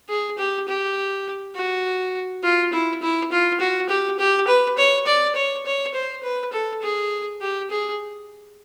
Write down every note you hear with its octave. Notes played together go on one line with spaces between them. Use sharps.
G#4
G4
G4
F#4
F4
E4
E4
F4
F#4
G4
G4
B4
C#5
D5
C#5
C#5
C5
B4
A4
G#4
G4
G#4